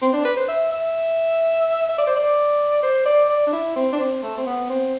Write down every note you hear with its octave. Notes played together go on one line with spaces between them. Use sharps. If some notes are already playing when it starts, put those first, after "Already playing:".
C4
D4
B4
C5
E5
E5
E5
D5
C5
D5
C5
D5
D5
D4
E4
C4
D4
C4
A3
C4
B3
C4